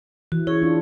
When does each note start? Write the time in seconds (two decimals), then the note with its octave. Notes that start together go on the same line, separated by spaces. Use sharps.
0.32 E3 F#4
0.47 E4 G#4 C#5
0.62 D4 F4